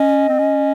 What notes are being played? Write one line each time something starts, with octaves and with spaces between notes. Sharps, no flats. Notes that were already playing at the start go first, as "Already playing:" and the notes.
Already playing: C#4 D#5
C4
C#4